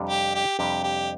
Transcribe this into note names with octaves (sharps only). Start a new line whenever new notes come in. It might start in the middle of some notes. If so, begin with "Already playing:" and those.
Already playing: F2 C3 G3 D4
G4
G4
F2 C3 G3 D4 G4
G4